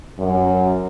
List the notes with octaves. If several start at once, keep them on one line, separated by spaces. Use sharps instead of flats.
F#2